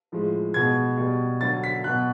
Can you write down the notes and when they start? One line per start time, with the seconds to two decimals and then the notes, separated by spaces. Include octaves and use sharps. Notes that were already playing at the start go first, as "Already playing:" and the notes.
0.12 A2 F3 G#3
0.54 B2 G#3 G#6
0.97 B2 G3
1.41 D3 F#3 A6
1.64 B6
1.84 B2 F#3 F#6